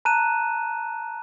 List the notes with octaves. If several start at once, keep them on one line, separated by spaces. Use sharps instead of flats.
A5 A#5 F#6 D#7 E7